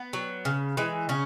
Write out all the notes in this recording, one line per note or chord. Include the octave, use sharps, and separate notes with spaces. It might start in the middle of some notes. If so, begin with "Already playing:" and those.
Already playing: B3
F#3
C#3
E3 G#3
C#3 C#4